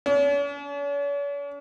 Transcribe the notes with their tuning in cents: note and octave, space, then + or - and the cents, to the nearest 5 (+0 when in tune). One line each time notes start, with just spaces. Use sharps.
C#4 +45